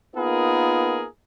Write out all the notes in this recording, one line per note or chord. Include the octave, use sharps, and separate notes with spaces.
A#3 B3 D#4 F4 G#4 A#4